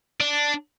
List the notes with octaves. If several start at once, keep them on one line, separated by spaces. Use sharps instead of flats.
D4